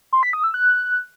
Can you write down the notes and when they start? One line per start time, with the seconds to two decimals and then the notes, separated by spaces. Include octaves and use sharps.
0.13 C6
0.23 B6
0.33 D#6
0.44 E6
0.54 F#6